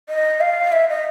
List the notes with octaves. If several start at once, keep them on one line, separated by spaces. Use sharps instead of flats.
D#5
F5
E5
D#5